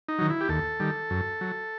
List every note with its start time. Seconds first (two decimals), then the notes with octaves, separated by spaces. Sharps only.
0.09 D#4
0.19 D#3 F#3
0.30 E4
0.41 G4
0.49 D#2 A4
0.80 D#3 G3
1.10 F#2
1.41 F#3